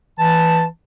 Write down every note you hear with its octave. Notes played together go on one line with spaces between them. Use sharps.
E3 A5